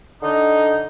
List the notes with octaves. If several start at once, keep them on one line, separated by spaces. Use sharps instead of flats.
D3 D#4